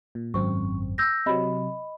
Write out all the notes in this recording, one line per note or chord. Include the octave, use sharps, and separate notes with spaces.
A#2
G#1 F#2 C4 C#6
E6 G6 A#6
C3 F#3 D#5 B5